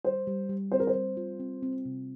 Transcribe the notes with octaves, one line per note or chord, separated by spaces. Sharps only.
G3 C5
G3
G3
C4 C5
A#4
C5
G3
F4
C4
C4
C3